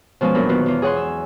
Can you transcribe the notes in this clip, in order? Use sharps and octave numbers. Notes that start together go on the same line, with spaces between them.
B2 F3 G#3 C#4
E2 A#2 F#3 D4 A#4 B5
B2 D#3 B3 F4 F#4
E2 F4
G#4 C#5 F#5 G#5 C6
E6